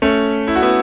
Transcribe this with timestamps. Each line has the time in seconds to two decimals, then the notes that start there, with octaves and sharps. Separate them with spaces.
0.02 A3 C#4
0.47 E4
0.55 F#4
0.62 B3 E4